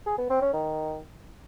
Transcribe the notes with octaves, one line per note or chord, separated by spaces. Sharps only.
G#4
B3
C4
C#4
D#3